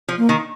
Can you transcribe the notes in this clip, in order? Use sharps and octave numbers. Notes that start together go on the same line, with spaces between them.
F3
A#3
D#3